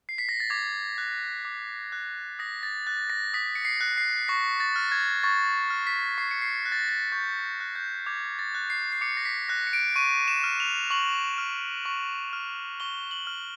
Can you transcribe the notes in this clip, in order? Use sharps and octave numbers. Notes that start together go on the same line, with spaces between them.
C7
B6
A#6
A6
D6 G#6
F#6
D6
F#6
D#6 A#6
A6
F#6 A6
A#6
D#6 B6
C#7
C7
F#6
C7
C#6 A#6
A6
F6
G#6
C#6 A6
F6
B6
C#6 C7
C#7
C7
F#6 A#6
A6
A#6
A6
C#6 G6
F#6
G6
D6 G#6
A6
F#6
C7
C7
D6 C#7
A#6
B6
F#6 A#6
C#7
D7
C#6 D#7
E7
F6
F7
C#6 F#7
F6
C#6
F6
C#6 G7
F#7
F6